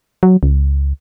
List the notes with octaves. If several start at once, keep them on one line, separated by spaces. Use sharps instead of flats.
F#3
C#2